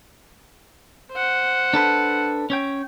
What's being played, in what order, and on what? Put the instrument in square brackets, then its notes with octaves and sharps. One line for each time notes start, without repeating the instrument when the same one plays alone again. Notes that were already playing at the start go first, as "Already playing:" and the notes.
[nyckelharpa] C5 F#5
[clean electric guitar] D4 A4 B4
C#4 C#5 G5